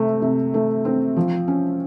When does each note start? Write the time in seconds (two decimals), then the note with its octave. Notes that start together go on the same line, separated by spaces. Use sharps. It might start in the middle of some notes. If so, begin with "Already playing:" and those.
Already playing: C3 A3
0.22 C3
0.54 A3
0.85 C4
1.16 F3
1.48 C#4